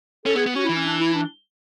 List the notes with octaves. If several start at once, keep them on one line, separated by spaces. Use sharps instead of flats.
C#4 A4
B3 G#4
B3
C#4 F#4
E4
E3 C#4
D4
E4
D4